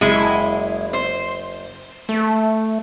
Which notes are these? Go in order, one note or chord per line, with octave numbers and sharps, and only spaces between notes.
F#1 G#3 E4
C5
A3